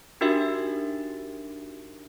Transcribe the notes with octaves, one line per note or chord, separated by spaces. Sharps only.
D4 D#4 F#4 G4 A#4 E5